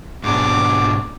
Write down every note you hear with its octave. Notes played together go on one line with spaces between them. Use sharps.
G#2 B2 D4 D6